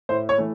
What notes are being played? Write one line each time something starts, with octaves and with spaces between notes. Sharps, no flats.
A2 C5
C#5
E3 A3